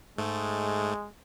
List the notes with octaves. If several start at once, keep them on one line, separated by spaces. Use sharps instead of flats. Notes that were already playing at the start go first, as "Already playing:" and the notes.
G#2 G#3 A3